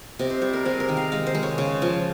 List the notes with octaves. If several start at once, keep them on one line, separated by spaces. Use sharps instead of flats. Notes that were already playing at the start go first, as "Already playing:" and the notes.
C3 D#5
C5
G3 C5
A#4
C3 G#4
A#4
D#3
F5
G#3 F5
C5
G#3
C#5
C#3
F3